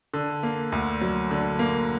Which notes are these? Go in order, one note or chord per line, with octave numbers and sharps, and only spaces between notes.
D3
A#3
D2
F#3
D3
A#3